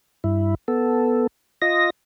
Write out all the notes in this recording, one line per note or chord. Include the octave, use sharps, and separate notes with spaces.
G2 E4
B3 A4
F4 D#5 A#6